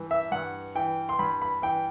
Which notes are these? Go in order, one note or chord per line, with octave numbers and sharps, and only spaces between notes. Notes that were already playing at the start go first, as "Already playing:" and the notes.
Already playing: G2 E3
E5
G2 F#5
E3 G5
C6
G2 B5
B5
E3 G5